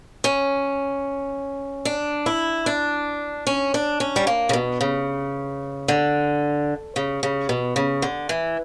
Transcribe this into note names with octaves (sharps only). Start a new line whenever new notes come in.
C#4
D4
E4
D4
C#4
D4
C#4
G3
A#3
C#3
B2
C#3
D3
C#3
C#3
B2
C#3
D3
E3